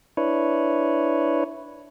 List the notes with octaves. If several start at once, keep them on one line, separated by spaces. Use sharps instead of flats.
D4 E4 B4 C#5